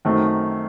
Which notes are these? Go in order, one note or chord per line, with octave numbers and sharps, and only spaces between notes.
F#2 D#3 A3 C4